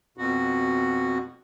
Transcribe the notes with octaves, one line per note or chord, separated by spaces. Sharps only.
F2 B2 F#4